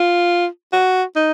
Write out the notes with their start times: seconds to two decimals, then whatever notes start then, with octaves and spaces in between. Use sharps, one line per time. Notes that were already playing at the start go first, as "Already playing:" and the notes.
Already playing: F4
0.73 F#4
1.16 D#4